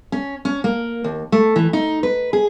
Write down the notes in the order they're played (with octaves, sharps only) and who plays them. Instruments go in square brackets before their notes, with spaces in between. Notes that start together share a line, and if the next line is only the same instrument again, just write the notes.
[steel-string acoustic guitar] C#4
C#4
A#3
D#2
A3
E3
D#4
B4
G#4